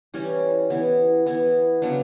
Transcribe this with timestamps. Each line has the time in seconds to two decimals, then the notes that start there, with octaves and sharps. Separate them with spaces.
0.14 E3 G3 C#4
0.70 E3 B3 E4
1.26 E3 B3 E4
1.82 C#3 F#3 B3 D4